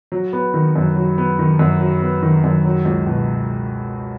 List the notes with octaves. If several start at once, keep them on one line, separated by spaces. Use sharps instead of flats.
F#3
B3
D#3
F#2
F#3
B3
D#3
F#2
F#3
B3
D#3
F#2
F#3
C#2
B2